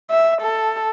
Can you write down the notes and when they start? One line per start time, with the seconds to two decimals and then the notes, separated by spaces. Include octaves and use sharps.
0.10 E5
0.41 A4